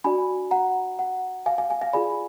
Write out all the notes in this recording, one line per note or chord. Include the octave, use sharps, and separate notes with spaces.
D4 F#4 D5 G#5 B5
F#5 A#5
F#5
F5 G#5
F5 G#5
F5 G#5
F5 G#5
F4 G#4 D5 G#5 B5